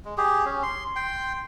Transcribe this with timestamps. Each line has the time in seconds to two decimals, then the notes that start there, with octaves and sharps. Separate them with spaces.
0.05 G#3
0.17 G4 G#4
0.45 C#4
0.63 C6
0.96 G5 C6